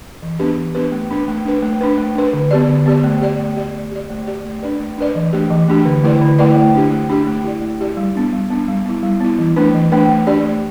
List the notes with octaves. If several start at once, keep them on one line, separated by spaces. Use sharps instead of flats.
E3
B3 D4 G4 B4
E3
B3 D4 G4 B4
A3
D4 B4
A3
D4 B4
A3
D4 B4
A3
D4 B4
D3
B3 G4 D5
D3
B3 G4 D5
A3
G4 D5
A3
G4 D5
A3
G4 D5
A3
G4 D5
A3
D4 B4 D5
A3
D4 B4 D5
E3
A3 D4 G4
E3
A3 D4 G4
D3
A3 E4 B4 D5
D3
A3 E4 B4 D5
A3
D4 G4
A3
D4 G4
A3
E4 G4 D5
A3
E4 G4 D5
G3
B3 D4
G3
B3 D4
G3
B3 E4
G3
B3 E4
E3
A3 D4 B4
E3
A3 D4 B4
A3
D4 G4 D5
A3